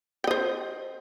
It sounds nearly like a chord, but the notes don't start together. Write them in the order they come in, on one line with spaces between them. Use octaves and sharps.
G5 D#5 C5